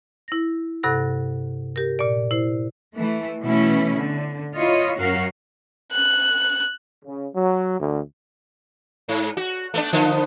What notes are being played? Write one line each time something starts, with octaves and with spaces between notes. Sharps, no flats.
E4 A#6
G2 C3 A4 F#5 F#6 A#6
G4 A#4
A#2 D5
E4 C5
E3 A3
B2 E3 A3 C#4 E4
D3
E4 F4 C#5 D#5
F#2 C#4 F#4 A#4 F5
F#6
C#3
F#3
D2
G#2
F#4
A3 B3 D4
D3 F3 B3